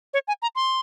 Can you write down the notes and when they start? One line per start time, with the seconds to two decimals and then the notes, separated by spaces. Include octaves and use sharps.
0.14 C#5
0.28 G#5
0.42 A#5
0.56 C6